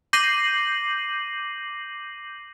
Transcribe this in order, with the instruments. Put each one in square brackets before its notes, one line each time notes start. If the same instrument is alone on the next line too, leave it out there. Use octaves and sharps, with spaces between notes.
[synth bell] D6 G6 A#6 C7 D#7 F#7